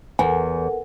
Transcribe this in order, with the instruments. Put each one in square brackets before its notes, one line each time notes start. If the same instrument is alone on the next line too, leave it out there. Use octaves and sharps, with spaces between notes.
[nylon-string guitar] E2 [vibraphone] A4 A#4 F#5 [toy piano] G#5